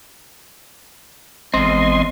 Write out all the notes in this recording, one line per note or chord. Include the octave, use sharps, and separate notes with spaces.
G#1 E2 G#3 C4 D#5 C6